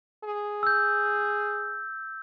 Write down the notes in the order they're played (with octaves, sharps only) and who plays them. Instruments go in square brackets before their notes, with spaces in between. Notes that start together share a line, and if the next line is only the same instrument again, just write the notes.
[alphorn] G#4
[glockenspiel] E6 G6